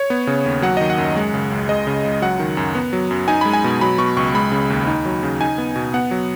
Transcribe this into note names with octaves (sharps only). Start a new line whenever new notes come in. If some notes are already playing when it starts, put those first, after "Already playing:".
Already playing: C#5
B3
C#3
D#2
F#3 F#5
D#3 D#5
F#5
F#2
G#3
C#3
C#2
G#3 D#5
C#3
C#2
F#3 F#5
D#3
F#2
B3
F#3
F#2
D#4 G#5
G#3 B5
G#5
B2
F#3 B5
B2 C#6
C#2 C#6
G#3 B5
C#3
D#2
D#4
F#3
C#3
D#4 G#5
B3
B2
B3 F#5
F#3